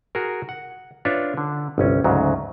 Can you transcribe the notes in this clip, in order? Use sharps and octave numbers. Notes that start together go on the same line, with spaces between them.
F#4 G#4 A#4
F#5
D4 F4 B4 C#5 E5
D3
G1 C2 C#4
D2 G#2 C#3 F#3